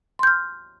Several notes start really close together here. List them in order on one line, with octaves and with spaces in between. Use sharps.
C6 G6 F6